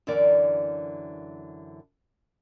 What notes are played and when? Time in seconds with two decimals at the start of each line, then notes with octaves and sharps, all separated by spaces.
0.07 F#2 D3 E3 A#4 D5